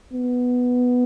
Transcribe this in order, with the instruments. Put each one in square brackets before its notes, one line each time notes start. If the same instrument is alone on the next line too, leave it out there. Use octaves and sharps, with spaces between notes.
[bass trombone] B3